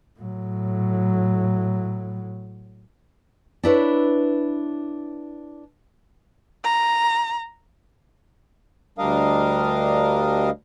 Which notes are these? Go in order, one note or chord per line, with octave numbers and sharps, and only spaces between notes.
A2 F#3
D4 E4 B4 C#5
A#5
D2 G3 D4 A#4 D#5 F5